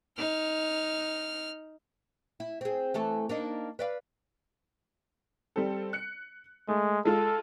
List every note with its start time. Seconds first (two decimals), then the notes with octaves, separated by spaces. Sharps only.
0.18 D#4 F6
2.40 E4
2.61 C4 G#4
2.94 E3 A3 A4
3.29 A#3 D4 D#4
3.79 B4 D5 F5
5.56 G3 C4 A4
5.93 F#6 C#7
6.68 G#3 A3
7.05 G#3 F4 A4 E6